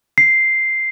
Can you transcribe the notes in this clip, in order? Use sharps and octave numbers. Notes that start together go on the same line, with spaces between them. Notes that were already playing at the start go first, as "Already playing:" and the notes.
C7